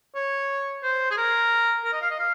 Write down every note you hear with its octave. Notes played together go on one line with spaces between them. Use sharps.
C#5
C5
G#4
A#4
A#4
D#5
F5
D#5
F5